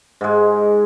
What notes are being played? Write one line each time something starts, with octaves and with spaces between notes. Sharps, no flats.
G#2 G#3